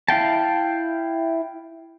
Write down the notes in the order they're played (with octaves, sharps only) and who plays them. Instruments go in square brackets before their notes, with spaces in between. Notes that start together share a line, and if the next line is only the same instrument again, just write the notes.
[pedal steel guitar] E4 F5 G5 A5